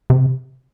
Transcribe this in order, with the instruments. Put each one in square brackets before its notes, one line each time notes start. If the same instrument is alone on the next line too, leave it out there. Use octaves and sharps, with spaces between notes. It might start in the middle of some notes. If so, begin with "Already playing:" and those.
[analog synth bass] C3